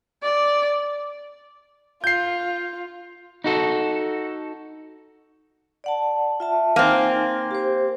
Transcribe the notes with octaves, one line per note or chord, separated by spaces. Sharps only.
D5
F4 G6 C7
D#4 F#4 A4
D5 F#5 A5
F4 E5 A5
A#3 C4 D#4 G#5
G4 C5